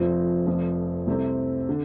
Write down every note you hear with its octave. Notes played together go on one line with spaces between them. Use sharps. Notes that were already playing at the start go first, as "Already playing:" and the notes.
Already playing: F1 F2 F3 C4
F1 F2 F3 C4
C2 C3 A3 C4
D3